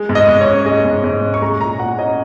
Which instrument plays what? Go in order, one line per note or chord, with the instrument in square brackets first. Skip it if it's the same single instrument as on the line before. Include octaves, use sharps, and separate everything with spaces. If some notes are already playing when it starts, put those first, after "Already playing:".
Already playing: [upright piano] G#3
G#2
D#5
G#2
C#5
C#4
G#3 D#5
G#2
G#2
C#4
C#6
G#3 A#5
A#2 A#5
A#2 F#5
C#4 D#5